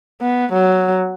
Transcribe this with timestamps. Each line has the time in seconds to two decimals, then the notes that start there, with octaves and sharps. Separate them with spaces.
0.21 B3
0.53 F#3